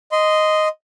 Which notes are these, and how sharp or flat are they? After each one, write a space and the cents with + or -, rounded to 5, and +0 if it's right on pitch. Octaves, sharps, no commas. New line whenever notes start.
D#5 +0 C6 -15